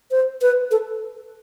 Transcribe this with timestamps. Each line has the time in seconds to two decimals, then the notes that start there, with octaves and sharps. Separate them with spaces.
0.11 C5
0.42 B4
0.71 A4